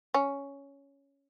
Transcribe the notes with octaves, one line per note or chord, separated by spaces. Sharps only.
C#4